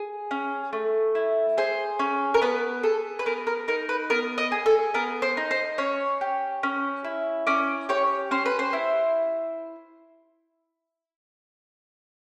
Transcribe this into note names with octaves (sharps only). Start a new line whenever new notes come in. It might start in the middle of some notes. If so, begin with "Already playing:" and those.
Already playing: G#4
C#4
A3
E4
G#4 C5
C#4
A#4
B3 B4
G#4 A4
B4
B3 A#4
A#4
D#4 A#4
B4
B3 A#4
D#5
G#4
A4
B3 A#4
C5
D#4
C5
C#4 C#5
G4
C#4
E4
C#4 D5
G4 C#5
C#4 C5
B4
C5
E4